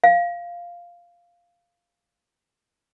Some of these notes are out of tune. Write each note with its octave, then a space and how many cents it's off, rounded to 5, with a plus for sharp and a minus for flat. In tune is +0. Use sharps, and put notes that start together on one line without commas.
F5 -5